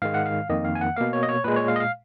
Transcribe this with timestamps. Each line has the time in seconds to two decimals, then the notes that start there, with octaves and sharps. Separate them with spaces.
0.02 G#2 D#3 G#3 F5
0.14 F#5
0.26 F5
0.49 F2 D#3 A#3 D#5
0.65 F5
0.75 G#5
0.81 F#5
0.96 B2 A#3 F5
1.13 C#5
1.23 D#5
1.29 C#5
1.44 A#2 G#3 B4
1.56 C#5
1.68 F5
1.76 D#5
1.80 F5